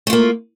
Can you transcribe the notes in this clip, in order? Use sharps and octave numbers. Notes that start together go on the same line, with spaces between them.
A3 A#3 F4